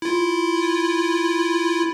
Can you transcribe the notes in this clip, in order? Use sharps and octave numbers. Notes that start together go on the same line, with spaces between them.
E4 F4